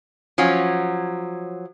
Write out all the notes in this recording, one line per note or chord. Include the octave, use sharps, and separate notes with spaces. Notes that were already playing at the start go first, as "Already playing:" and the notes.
F3 F#3 C#4